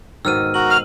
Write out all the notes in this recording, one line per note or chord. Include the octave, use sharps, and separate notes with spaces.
G#2 B2 D#3 E6 F6 D#7
F#4 A#4 F#7
F6